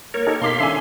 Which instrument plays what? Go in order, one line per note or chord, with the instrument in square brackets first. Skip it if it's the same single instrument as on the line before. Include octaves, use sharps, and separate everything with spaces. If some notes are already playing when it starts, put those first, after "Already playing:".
[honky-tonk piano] A#3 [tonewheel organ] A#4 C#5
[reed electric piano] D#4 G4 A4
[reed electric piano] B2 [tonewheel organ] F5 C6 [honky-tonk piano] A#5 D6 B6
[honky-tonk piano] D#3 C#4 G#5 [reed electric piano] D4 A4 E5